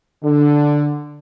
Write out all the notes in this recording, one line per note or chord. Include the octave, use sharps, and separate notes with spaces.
D3